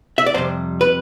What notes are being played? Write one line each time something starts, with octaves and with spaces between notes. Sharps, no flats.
E5
D5
F2 C3 G3 C5
B4